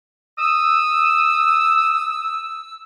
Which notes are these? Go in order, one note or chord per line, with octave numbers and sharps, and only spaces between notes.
D#6 E6